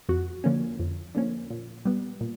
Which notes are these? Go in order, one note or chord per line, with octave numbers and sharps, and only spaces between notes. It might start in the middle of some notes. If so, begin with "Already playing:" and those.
F2 F#4
D3 F3 A#3 C#4
F2
D3 F3 A#3 C#4
A#2
G3 B3
A#2